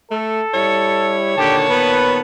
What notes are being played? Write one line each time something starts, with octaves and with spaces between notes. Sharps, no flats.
A3 A4
G3 E4 C#5
A#2 D3 D#3 G4 A5
B3 B4